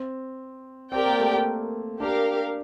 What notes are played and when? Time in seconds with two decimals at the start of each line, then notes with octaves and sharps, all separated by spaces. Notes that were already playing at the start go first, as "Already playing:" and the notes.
Already playing: C4
0.92 C4 G4 A#4 D5 G5
1.06 A#3
1.20 A3
1.33 A#3
2.00 D4 G4 A#4 F5